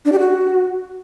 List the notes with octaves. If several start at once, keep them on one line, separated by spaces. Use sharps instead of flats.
D4
G4
F#4